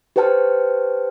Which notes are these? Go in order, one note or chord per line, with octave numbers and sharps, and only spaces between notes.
G4 B4 C5 G5 A5 F6